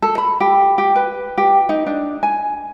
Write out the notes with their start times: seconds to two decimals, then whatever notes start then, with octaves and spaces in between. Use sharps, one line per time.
0.02 A4
0.18 B5
0.40 G4
0.78 G4
0.96 B4
1.38 G4
1.69 D#4
1.86 D4
2.23 G#5